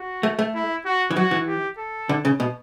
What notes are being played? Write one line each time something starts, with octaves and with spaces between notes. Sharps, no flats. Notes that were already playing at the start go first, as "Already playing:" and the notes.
Already playing: F#4
A3
A3
E4
F#4
E3
F#3 F#4
E3
G4
A4
D3
C#3
B2